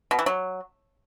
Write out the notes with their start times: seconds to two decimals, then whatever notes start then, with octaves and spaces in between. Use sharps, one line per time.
0.11 B2
0.19 E3
0.26 F#3